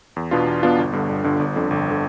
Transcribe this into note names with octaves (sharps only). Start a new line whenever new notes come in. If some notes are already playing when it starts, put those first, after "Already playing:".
E2
B2 B3 D4 F4
E2
B2 B3 D4 F4
G1
G2 D3
G1
G2 D3
G1
F2 D3
G1
D3